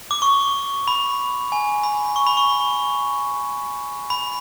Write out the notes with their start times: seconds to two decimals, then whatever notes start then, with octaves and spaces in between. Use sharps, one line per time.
0.11 D6
0.22 C#6
0.88 B5
1.52 G#5
1.84 B5
2.16 C#6
2.27 B5
2.37 C#6
4.10 B5